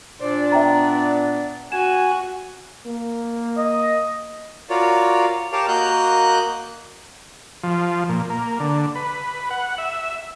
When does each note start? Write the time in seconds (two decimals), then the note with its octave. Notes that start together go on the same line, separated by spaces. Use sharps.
0.20 A#2 D4 C5 D5
0.52 B3 E5 G5 A#5
1.72 F#4 G#5 E7
2.86 A#3
3.58 D#5
4.70 F4 F#4 A#4 C#5 D5
5.52 G4 A#4 C#5 F5 A5 D6
5.68 A#3 F#4 A#4 D#5 F#6 G6
7.64 F3
8.09 A#2
8.30 A#3
8.60 D3
8.96 B4
9.51 F#5
9.78 E5